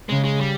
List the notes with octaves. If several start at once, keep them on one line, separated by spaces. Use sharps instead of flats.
C#3 G#3
G#3
G3